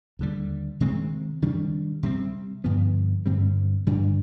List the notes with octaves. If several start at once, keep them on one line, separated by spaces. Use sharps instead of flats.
D#2 D3 G3
C3 D#3 G#3 C4
C3 D#3 G3 D4
C3 G3 C4
G2 D3 F3 B3
G2 D3 G3 C4
G2 D3 G3 D4